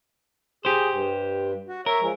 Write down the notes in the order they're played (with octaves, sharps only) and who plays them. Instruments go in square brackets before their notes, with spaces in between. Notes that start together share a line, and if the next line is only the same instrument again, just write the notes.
[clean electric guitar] G4 C5 [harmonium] G#4
[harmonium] G2
F#4
[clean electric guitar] A#4 [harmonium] C#5 E5
[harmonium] F3 G#3